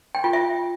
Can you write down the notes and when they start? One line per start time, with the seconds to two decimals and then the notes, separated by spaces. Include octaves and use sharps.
0.15 G5
0.24 F4
0.33 E5